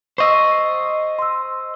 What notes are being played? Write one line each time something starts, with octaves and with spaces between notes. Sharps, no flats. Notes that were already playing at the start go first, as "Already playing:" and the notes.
C5 D#5 C#6 E6
C6 E6